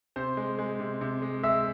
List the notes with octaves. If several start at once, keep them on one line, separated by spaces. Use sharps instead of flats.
C3 C5 C6
G#3
G#3
C3
C3
G#3
G#3 E5 E6